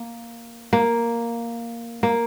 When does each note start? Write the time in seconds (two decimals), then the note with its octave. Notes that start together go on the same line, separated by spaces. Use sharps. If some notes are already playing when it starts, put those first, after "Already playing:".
Already playing: A#3
0.73 A#3
2.03 A#3